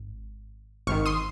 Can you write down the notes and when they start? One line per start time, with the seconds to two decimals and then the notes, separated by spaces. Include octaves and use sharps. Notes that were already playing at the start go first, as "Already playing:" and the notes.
Already playing: G#1
0.87 G#1 G#2 D#3 C#6 F6
1.06 C6 D#6